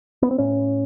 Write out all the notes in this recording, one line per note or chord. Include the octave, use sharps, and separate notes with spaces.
B3
C4
A2 C#4